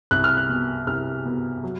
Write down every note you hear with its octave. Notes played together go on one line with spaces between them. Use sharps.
C2 F#6
F6
F#6
B2
C2 F6
B2
F#3